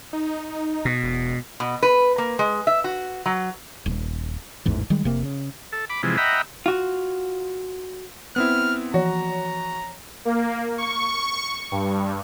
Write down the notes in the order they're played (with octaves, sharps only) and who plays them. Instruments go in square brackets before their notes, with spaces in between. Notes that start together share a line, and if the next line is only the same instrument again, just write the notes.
[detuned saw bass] D#4
[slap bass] B2
[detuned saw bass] E1
[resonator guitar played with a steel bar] B2
B4
A#3
G#3
E5
F#4
F#3
[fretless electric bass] D#1
A1 E2 G#2 E3
D#3 G3 G#3
F1 C3 A#3
C#3
[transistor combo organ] A4
B5 D6
C3 E3 F3 G#3
D#5 E5 F#5 G5 A#5 B5
[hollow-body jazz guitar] F4 F#4
[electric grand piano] B3 C4 E4 [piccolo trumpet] F6
[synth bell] E3 F3 C#5 [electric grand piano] F#4 [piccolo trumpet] A#5
[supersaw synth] A#3
C#6
G2